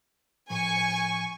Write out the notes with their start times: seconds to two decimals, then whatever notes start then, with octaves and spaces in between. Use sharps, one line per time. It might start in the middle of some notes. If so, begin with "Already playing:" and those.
0.50 A2 F3 G#5 C#6